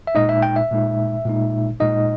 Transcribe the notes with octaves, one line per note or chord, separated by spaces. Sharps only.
E5
A#2 G#3 D#4 D#5
E5
G5
E5
A#2 G#3 D#4
A#2 G#3 D#4
A#2 G#3 D#4 D#5